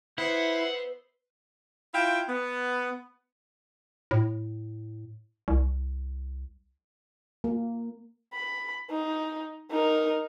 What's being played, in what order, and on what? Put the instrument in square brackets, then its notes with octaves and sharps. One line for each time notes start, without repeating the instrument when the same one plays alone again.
[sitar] B3 [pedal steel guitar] E4 [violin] C5 E5 [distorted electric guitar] F#5
[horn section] E4 F4 F5 G5
B3
[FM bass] A2
C2
[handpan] A#3
[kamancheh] B5
D#4
D#4 A#4